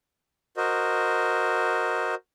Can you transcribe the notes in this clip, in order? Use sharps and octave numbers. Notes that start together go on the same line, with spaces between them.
F#4 A#4 C5 D#5